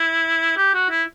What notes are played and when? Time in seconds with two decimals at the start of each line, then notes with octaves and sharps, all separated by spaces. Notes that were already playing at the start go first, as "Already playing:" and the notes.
Already playing: E4
0.57 G4
0.74 F#4
0.90 E4